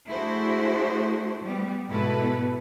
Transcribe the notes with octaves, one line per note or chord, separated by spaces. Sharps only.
A3 D4 E4 F#4 G#4 C5
G3 B3
G#2 B2 E4 A4 B4